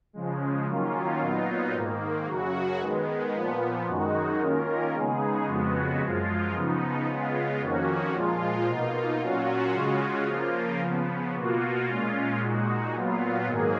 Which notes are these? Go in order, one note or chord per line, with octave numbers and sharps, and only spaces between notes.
C#3 F3 G#3
D#3 F#3 A#3 C#4 F4
A#2 F#3 B3 D#4 F4
G#2 D#3 A#3
F#2 C#3 F#3 F#4
D#3 G#3 B3
A#2 F3 B3
F#2 D#3 G#3 D#4 F#4
D#3 A#3 C#4 F4 A#4
C#3 G#3 B3 D#4 G#4
F2 C#3 G#3 B3 F#4
F#2 F3 G#3 F4
C#3 F3 B3 D#4
C#3 G#3 B3 F4
F2 D#3 A#3 C#4 F#4
A#2 F3 G#3 F4
B2 A#3 D#4 F4
A#2 F#3 C#4 F4 F#4
C#3 G#3 C#4 F4
C#3 F3 A#3 F4
C#3 F3 B3
B2 A#3 F4 F#4
A#2 G#3 C#4 F4
A#2 G#3 D#4 F#4
A#2 F#3 B3 F4
G#2 D#3 F#3 A#3 G#4